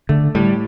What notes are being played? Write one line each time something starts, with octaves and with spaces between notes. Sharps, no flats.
D3 A3
A2 G3